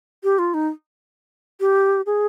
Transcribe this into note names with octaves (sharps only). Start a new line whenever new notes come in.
G4
F4
D#4
G4
G#4